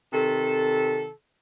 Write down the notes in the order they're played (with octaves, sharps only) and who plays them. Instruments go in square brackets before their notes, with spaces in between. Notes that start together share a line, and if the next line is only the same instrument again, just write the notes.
[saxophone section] C3 D#3 A4